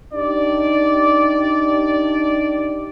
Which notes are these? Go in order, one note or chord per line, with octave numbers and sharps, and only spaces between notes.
D4 D#4 G4 D5